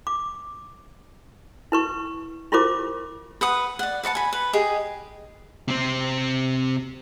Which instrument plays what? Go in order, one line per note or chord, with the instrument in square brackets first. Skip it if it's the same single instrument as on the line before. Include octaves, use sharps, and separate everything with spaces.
[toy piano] D6
E4 B4 C#6
E4 F4 G4 A#4 C5 D6
[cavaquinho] B4 F#5 D#6
D5 F#5
B4 D5 F#5 A5
G#5 B5
B4
G4 G#4 D#5
[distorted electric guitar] C3 C4